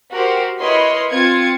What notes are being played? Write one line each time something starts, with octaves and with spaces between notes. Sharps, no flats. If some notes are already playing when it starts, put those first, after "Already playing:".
F#4 G4 A#4 C5
E4 A#4 B4 C#5 D#5 C6
C4 F4 G#6 C#7